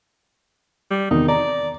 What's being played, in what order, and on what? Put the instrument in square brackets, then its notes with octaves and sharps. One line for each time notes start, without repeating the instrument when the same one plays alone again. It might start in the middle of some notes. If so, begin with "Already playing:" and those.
[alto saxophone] G3
[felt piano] E2 C3 D#3 [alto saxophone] D#4
[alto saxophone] D5 [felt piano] A#5